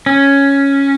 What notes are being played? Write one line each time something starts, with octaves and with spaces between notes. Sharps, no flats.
C#4